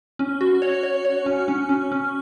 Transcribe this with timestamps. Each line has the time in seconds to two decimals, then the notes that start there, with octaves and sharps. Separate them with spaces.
0.19 C#4
0.41 F#4
0.62 C#5
0.83 C#5
1.05 C#5
1.26 C#4
1.48 C#4
1.69 C#4
1.92 C#4